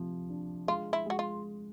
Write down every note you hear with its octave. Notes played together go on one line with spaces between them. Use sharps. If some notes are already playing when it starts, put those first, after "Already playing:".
Already playing: C3 F3
D4
G#3 F4
E4
G#3 F#4
F4